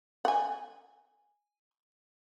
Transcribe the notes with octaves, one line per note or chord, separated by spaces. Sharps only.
F#5 G#5